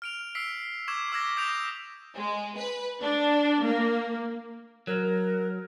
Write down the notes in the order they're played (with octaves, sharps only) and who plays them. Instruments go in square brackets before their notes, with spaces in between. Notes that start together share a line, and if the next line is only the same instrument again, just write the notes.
[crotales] F6 D7 F7
E6 F6 B6 C7 D7
C#6 D6 E6 G#6 E7
D6 E6 F6 G#6 A#6 B6
D6 D#6 G6 A#6 D7 F7
[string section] G#3
B4
D4
A#3
[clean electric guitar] F#3 [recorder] A#4